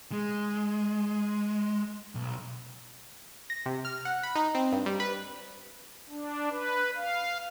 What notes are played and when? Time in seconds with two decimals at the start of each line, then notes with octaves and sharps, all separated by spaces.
0.12 G#3
2.15 B1
3.50 A#6
3.66 C3
3.85 F6
4.05 F#5
4.23 B5
4.35 D#4
4.55 C4
4.72 G2
4.86 G3
5.00 B4
6.10 D4
6.51 B4
6.96 F5